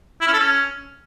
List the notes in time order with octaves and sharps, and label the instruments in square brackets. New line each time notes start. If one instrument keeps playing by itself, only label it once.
[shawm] E4
C#4
A4
C#4